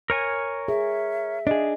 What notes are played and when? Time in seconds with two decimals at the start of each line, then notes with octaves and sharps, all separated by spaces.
0.10 A#4 C#5 G#5
0.68 G#4 E5
1.47 D4 G#4 D#5